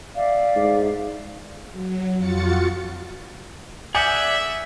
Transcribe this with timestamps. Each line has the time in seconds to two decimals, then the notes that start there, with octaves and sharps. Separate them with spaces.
0.15 D5 E5 F5
0.56 G#2
1.71 F#3
2.18 F2 F4 F#4 A6 C#7
3.95 G#4 D5 E5 F#5 G#5 G6 C#7